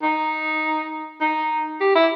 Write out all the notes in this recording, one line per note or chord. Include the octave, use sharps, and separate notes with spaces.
D#4
D#4
G4
E4